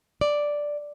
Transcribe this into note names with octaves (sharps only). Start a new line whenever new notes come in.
D5